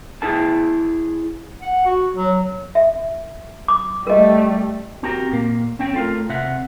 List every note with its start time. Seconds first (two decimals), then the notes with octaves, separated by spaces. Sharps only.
0.22 E4 G#4 A5
1.62 F#5
1.86 F#4
2.15 F#3
2.75 E5
3.68 D6
4.07 G3 A3 A#4 D#5
5.03 C4 F#4 G4 A#4
5.32 A#2 A#3
5.79 C4 C#4 G5
5.94 A3 F4 A#4
6.29 C3 E5 F#5